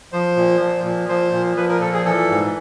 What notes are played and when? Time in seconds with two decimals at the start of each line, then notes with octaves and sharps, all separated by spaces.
0.12 F3 C5
0.36 A#2
0.61 F3
0.85 A#2
1.09 F3 C5
1.33 A#2
1.57 F3 B4
1.69 A#4
1.81 A#2 A4
1.93 G#4
2.05 E3 A4
2.29 G#2